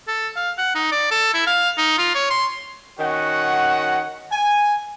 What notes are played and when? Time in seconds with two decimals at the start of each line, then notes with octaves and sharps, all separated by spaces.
0.08 A4
0.36 F5
0.58 F#5
0.75 D#4
0.92 D5
1.11 A4
1.34 E4
1.47 F5
1.78 D#4
1.98 F4
2.15 C#5
2.30 C6
2.99 D#3 C#4 F#4 F#5
4.32 G#5